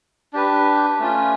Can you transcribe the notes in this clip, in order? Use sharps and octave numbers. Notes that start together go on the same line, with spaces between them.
D4 G4 B4
A3 C#4 F4